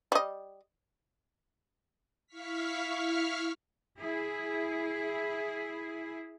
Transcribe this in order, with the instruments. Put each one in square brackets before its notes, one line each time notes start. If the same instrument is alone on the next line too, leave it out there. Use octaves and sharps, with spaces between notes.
[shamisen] G3 D#5
[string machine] E4 F5 C#6 F6 B6
[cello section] E4 G#4